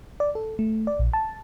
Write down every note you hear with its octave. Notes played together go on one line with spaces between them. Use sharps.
D5
A4
A3
D5
A#1
A5